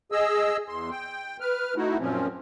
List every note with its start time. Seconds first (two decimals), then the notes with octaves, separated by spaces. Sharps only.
0.12 G#4 D#5 E6
0.69 E2 C6
0.91 G5
1.40 B4 F6
1.76 A3 D#4 E4 F#4
1.99 F#2 A#2 F3 C4 C#4